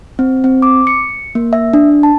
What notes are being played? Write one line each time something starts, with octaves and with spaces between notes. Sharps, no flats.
C4
C4
D6
C#7
A#3
E5
D4
A5